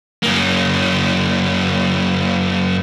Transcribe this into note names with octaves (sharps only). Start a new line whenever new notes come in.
F#2 A#3